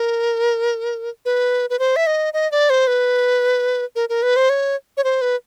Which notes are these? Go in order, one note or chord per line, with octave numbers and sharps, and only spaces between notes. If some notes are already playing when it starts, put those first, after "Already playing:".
Already playing: A#4
B4
B4
C5
E5
D#5
D#5
D5
C5
B4
A#4
A#4
B4
C5
C#5
C#5
C5
B4